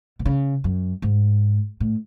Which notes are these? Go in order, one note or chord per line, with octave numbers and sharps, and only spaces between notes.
B2
C#3
F#2
G#2
A2